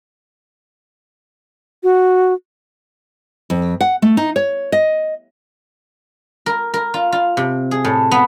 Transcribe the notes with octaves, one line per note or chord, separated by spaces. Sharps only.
F#4
F2
F#5
A3
D#4
C#5
D#5
A#4
A#4
F4
F4
C3
G#4
A2
B3